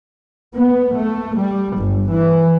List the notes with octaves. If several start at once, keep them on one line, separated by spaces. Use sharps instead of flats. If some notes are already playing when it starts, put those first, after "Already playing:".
B3
A3
G3
G1
E3